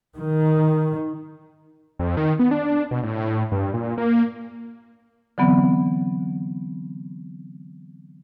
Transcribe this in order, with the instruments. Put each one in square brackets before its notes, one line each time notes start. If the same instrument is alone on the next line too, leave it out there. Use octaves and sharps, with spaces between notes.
[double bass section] D#3
[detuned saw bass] F2
D#3
B3
D4
B2
A2
G2
A#2
A#3
[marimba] D3 E3 F#3 B3 C4